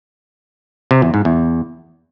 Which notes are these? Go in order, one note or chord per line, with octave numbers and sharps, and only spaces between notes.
C3
E2
G#2
E2